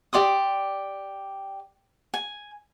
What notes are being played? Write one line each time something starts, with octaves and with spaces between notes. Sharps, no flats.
G4 D5 C6 D#6
G#5